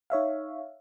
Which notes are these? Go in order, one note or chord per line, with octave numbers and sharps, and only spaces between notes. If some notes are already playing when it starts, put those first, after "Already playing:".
D#4 C#5 E5 F5